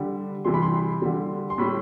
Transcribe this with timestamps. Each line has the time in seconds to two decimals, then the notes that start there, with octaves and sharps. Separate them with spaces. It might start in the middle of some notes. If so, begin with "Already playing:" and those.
Already playing: D3 G3
0.45 C3 E3 G3 C6
0.54 B5
0.62 C6
1.02 D3 G3
1.50 C6
1.58 A2 G3 B5